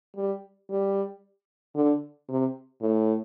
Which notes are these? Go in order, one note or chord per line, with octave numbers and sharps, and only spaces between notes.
G3
G3
D3
C3
A2